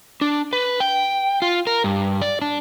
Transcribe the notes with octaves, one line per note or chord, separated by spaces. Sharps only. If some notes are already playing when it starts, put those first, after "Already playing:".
D4
B4
G5
F4
A#4
G2
D5
D4